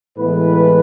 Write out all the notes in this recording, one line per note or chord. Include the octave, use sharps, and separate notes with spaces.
A2 E3 G#3 B3 B4